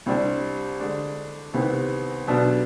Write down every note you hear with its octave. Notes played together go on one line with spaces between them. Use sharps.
C2 C3 G3 D4
D3 G#3 D4
C2 C3 D#3 B3
B1 B2 B3 D4